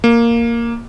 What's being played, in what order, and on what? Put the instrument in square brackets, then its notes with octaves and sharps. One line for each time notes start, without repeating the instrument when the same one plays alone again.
[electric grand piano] A#3